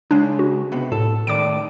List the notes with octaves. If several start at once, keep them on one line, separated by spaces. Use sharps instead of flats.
C#3 G#3 D4
F#4
C3 B3
A2 A4
A2 D#3 D5 D6 D7